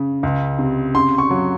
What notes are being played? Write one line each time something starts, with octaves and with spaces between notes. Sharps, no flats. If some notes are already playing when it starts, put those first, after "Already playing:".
Already playing: C#3
C#2
C3
C#3 C6
C#6
F#3